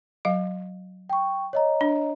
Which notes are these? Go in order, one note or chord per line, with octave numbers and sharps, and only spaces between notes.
F#3 F5
G5 C#6
C#5 D#5 A#5
D4